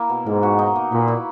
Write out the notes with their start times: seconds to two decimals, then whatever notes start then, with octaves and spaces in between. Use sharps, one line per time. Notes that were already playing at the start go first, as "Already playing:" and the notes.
Already playing: A#3 E4
0.09 B2
0.26 G#2 A#4
0.43 F#4
0.59 D#4
0.76 A#3
0.92 A#2 B4
1.08 E4